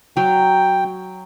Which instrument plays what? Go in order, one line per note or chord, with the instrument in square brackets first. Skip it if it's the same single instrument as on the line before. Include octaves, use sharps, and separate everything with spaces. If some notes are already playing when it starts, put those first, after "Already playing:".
[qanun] F#3 [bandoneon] G5